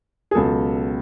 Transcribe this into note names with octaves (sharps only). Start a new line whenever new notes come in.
G#4
C#2 B2 F#3 A4